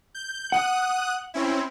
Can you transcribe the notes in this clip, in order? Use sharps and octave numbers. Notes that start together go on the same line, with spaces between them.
G6
F#5 D#6 F#6
C4 C#4 E4